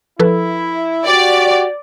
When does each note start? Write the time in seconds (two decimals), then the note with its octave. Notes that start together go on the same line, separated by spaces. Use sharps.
0.19 F3 E4 A4 B4
1.06 F#4 G4 D5